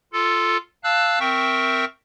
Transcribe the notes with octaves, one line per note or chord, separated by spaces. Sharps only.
F4 A4
F5 A5 E6 F#6
C4 A#4 E5 G5 C#6